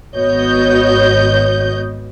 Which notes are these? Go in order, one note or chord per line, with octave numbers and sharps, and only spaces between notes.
G#1 B3 F#4 C#5 D#5 G6